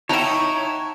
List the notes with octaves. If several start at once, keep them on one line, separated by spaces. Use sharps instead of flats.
D#4 E4 C#5 F#5 G5 A5 A#5 E7